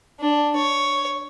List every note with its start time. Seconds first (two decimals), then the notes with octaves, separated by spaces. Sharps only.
0.21 D4
0.56 C#5